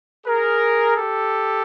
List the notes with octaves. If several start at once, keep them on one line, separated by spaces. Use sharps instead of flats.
G#4 A#4
G4 A4